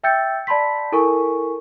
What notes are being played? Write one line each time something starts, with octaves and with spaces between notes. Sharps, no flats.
E5 G5 E6 G6 A6 C#7
D5 A5 B5 C6 B6
E4 A4 A#4 G#5 C#6